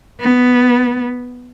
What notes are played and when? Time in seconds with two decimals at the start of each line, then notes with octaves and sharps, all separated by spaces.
0.21 B3